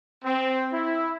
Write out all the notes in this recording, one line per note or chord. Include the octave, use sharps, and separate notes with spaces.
C4
E4